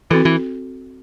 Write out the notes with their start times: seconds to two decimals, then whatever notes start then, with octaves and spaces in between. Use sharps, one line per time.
0.10 E3 C4 F#4 A4
0.25 E3